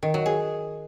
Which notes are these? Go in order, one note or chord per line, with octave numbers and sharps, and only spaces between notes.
D#3
F#3
G#4